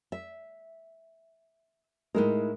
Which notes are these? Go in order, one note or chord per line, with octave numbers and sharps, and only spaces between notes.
E5
A2 G#3 D#4 E4 A#4